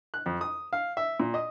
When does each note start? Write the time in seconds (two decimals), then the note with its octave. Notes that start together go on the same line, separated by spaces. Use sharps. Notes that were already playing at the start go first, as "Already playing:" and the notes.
0.14 F#6
0.26 F2
0.41 D#6
0.73 F5
0.97 E5
1.20 A#2
1.34 D#5